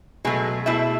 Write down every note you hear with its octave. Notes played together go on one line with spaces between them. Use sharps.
B2 F#3 G#3 A3 G#4
B2 A3 E4 E5